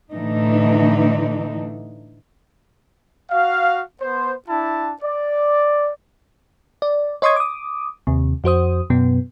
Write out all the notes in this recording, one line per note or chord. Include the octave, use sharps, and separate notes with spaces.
A2 D3 E3 D4 D#4
F#4 F5
B3 C5
D4 E4 A5
D5
D5
C#5 D#5 C6 C#6 D#6 G#6
D6 D#6
D#2 C3
F2 F#4 C5 D#6
F#2 B2 B3